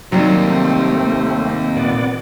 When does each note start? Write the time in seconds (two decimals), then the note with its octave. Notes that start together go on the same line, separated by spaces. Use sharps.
0.12 D#2 C3 D#3 F#3 G3
0.48 A3 C4
1.77 A#2 B3 D5